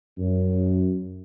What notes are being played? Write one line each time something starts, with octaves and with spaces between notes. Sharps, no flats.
F#2